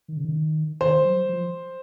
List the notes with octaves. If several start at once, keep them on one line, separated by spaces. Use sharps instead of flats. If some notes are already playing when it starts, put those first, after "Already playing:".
D#3
C#3
D#3
D#3 C5
F#3
F3